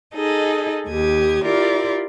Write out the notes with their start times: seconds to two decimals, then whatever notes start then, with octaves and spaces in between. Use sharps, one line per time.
0.14 D#4 G#4 A4 D#5
0.87 D#2 G4 D#6 G#6
1.44 E4 F4 G4 A#4 D5